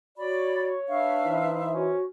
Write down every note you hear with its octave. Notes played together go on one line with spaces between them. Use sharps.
F#4 C#5 D5 B5
D4 B4 E5 F5
E3 D#4 C5
C#4 F#4